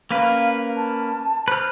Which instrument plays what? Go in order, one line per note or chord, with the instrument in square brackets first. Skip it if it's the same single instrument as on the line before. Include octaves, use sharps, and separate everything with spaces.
[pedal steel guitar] A#3 C#4 B4 [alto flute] F5
[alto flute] A5
[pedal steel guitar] B4 F6 [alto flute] C5